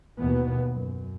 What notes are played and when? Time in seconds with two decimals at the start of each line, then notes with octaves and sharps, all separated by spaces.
0.18 D#2 B2 E3 B3
0.70 F#2